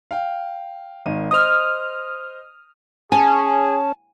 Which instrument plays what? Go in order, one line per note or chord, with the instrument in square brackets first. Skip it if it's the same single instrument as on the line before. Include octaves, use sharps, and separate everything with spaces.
[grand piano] F5 G5
G#1 D#3 D#7
[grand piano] C5 D#5 [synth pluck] D#6 F6
[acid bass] C#4 [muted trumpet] G#4 [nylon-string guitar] G#5 [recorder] A5